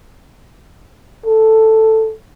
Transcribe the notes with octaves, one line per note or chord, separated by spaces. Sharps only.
A4